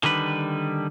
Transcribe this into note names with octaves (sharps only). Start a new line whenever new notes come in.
D3 D#3 G3 B4